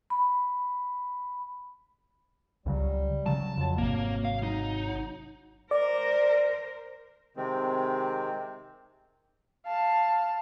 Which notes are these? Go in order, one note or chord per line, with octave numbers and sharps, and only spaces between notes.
B5
C#2 C#3 F#3 G3
C#3 F#3 A5
F2 F#3
G#1 C3 A#3
F5
D#4
A#4 C5 D5
C3 D#3 G#3 C4
F5 A5